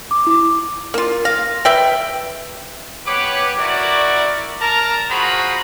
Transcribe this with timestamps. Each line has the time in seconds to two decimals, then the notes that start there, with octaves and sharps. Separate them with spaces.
0.11 D6
0.27 E4 D6
0.94 A#3 F4
1.25 F5 A#6
1.65 B4 E5 G5 D7
3.07 B3 G4 B4 C#5 D6
3.59 E4 F#4 A#4 D5
4.61 A#4 A5 A#5
5.11 F4 F#4 G#4 C5 A#5 B5